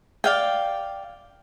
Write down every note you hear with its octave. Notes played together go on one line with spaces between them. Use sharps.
D5 F5 G5